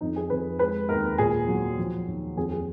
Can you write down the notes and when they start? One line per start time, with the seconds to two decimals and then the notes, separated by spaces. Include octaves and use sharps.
0.01 F2 D#4
0.16 G#4
0.30 F2 B4
0.59 G#3 B4
0.89 D#2 A#4
1.18 A#2 G#4
1.48 F#3
1.78 F3
2.07 D#2
2.36 F2 G#4
2.52 G#4